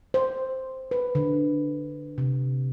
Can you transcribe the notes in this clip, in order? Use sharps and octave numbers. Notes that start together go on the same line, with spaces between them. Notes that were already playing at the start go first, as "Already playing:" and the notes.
C5
B4
D3
C3